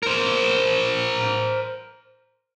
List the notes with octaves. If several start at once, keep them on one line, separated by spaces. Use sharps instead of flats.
A#4 C5